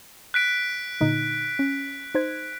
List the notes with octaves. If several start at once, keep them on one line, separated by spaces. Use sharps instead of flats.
F#6 B6 D7
A#2 D3 D#4
C#4
D#4 C5 G#6